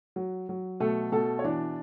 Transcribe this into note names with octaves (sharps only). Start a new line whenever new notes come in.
F#3
F#3
B2 A3 A4
B2 A3 A4
C#5
E3 D4 D5